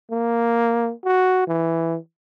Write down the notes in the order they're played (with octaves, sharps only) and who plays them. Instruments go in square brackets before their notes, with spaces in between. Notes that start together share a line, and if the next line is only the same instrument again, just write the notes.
[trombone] A#3
F#4
E3